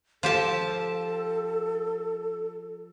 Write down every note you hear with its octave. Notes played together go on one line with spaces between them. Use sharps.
F3 G4 A4 A5